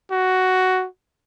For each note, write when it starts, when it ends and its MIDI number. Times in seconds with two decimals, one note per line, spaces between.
0.11 0.87 66